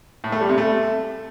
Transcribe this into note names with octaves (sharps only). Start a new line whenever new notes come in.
A2
A3
G3
C3
A3